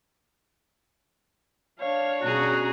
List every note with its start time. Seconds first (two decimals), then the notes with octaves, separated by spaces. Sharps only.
1.80 D4 C#5 F5
2.22 B2 C#4 F#4 G#4 A#5